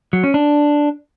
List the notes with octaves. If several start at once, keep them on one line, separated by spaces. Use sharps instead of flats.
F#3
C#4
D4